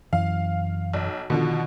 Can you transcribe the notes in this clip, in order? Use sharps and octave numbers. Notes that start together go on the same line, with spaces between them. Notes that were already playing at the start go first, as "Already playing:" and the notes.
F#2 E3 F5
B1
B2 D3 D#3 F3